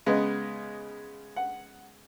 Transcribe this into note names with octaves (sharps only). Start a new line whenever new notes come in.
C#3 G#3 B3 D#5
F#5